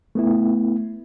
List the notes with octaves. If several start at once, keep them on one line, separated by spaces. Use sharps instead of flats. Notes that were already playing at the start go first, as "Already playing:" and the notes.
A3 B3 E4